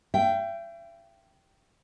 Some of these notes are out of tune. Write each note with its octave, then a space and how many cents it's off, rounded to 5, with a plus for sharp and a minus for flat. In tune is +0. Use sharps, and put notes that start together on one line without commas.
E5 +40 G5 -10